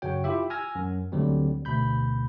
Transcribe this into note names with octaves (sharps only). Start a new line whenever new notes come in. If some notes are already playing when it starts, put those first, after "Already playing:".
F#2 C#3 F#4 C#5 G5
E4 F4 G4 E5
G#5 E6 F6 G#6 A#6
F#2
D2 D3 F#3 G3 C4
D2 B2 B5 G6